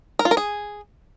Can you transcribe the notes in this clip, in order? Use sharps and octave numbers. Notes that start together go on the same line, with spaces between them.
A#4
F4
A#4
G#4